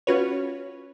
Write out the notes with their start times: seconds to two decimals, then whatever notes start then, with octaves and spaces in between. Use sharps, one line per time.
0.07 C#4 F4 F#4 B4 C#5